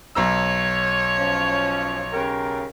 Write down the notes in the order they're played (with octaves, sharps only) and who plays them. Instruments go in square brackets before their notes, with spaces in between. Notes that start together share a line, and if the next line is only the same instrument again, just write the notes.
[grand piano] B1 A#5 E6 [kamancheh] C#5
[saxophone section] F3 C#4
C#3 G4 A#4